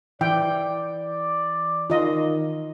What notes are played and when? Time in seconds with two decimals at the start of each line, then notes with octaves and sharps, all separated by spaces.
0.21 E3 D5 G5
1.90 D#3 F4 D#5